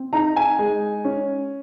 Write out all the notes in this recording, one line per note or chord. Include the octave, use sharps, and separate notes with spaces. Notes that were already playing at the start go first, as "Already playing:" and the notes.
Already playing: C4
D#4 A#5
G#5
G#3
C#4